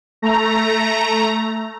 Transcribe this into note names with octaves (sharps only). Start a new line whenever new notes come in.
A3 A#5